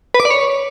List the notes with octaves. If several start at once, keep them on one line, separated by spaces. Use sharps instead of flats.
B4
D6
D5
C#5